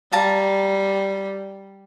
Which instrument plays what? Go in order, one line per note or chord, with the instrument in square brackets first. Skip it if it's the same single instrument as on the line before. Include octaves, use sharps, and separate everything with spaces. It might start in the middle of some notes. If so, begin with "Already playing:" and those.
[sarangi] G3 [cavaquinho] F5 A5 A#5